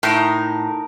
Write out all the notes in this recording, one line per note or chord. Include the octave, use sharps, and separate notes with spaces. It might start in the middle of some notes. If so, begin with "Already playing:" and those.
A2 D#4 A#4